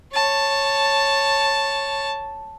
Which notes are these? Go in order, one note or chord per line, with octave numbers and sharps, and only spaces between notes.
C#5 A5